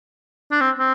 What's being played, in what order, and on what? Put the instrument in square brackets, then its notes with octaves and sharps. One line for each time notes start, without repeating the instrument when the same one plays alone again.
[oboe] D4
C4
C4